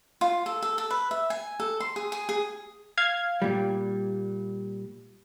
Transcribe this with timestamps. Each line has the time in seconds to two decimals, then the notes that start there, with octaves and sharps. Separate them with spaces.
0.21 F4
0.46 A4
0.62 A4
0.78 A4
0.90 B4
1.11 E5
1.30 G#5
1.60 A4
1.80 C6
1.96 G#4
2.12 G#4
2.29 G#4
2.97 F5 G#6
3.42 A#2 G3